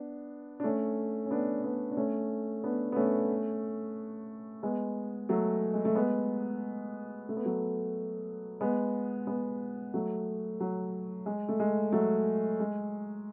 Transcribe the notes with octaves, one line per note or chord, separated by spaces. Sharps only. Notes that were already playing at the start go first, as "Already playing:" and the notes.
Already playing: B3 D4
D4
A3 C#4
C#4
B3 D4
B3 D4
D4
A3 C#4
B3 D4
B3
A3 C#4
G#3 B3
F#3 A3
G#3
A3
G#3 B3
A3
B3
F#3 A3
G#3 B3
G#3 B3
F#3 A3
F#3
G#3
A3
G#3
F#3 A3
G#3